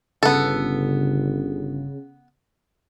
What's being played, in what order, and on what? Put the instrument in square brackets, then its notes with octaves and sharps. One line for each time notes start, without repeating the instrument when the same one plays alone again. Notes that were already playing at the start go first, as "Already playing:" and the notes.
[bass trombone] G1 [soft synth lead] C#3 [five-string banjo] B3 A4